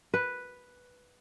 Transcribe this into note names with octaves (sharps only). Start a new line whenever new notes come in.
B4